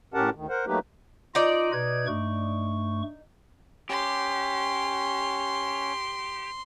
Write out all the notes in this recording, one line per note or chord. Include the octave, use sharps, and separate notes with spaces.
A2 C#4 G4 A#4 F#5 A5
D2 D#3
A#4 C5 F#5
F#3 A3 A#3 D#4 G4 B4
D#4 F4 D5 D#5
B2 B4 G#6
G2 A3 C#6
C#4 G4 C#5 C6